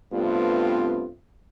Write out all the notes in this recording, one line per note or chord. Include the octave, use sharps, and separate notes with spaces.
G2 C3 A3 B3 C4 F4